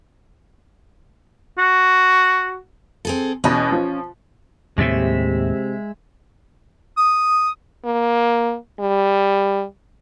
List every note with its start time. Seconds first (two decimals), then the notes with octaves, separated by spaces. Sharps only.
1.58 F#4
3.05 C4 G#4 A4
3.44 E2 B2 C#4
3.72 F3
4.78 D#2 A2 C3 G#3 E5
6.98 D#6
7.85 A#3
8.80 G3